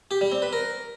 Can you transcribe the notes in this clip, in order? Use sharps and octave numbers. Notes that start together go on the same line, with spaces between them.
G4
G3
C4
B4
A#4